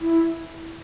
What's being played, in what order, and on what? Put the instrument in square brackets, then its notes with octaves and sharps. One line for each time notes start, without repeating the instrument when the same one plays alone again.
[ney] E4